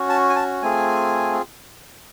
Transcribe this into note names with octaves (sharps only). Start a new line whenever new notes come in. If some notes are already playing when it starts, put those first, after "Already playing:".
Already playing: C#4 F#4
A5
G#5
A5
A3 C4 F4 G#4 G#5